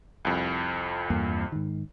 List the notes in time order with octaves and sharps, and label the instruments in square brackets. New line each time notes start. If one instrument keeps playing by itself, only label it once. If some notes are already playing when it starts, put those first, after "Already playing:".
[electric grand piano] C2 F2
[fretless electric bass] E2 G2 A#3
G#2 D#3